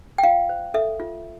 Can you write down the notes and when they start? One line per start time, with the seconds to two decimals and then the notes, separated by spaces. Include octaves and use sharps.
0.18 G5
0.23 F4 F5
0.49 C5
0.74 A4 E5
1.00 F4